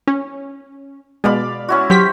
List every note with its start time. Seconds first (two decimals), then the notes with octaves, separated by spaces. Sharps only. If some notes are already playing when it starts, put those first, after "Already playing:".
0.08 C#4
1.24 B2 G#3 D5 F5 B5
1.68 C#4 E4 F#4
1.90 F#3 G4 C5 B6